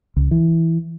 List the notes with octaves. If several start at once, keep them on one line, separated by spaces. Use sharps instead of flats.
C#2
E3